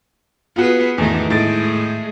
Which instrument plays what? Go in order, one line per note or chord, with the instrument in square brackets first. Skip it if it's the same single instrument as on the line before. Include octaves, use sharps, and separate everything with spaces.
[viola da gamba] B3 G#4 B4 [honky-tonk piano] F4 F#4
[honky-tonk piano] E2 [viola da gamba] G#2 D#3 A3
[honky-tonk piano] A2 A6 D7 [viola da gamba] G#3 A3